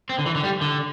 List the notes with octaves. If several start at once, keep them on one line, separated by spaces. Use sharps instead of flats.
C4
D3
E3
D3
G3
D3